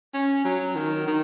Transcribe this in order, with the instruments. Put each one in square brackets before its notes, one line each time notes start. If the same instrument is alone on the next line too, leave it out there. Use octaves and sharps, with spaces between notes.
[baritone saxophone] C#4
F#3
D#3
D#3